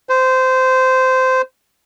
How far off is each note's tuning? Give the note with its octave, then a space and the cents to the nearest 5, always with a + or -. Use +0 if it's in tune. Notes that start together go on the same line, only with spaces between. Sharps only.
C5 -15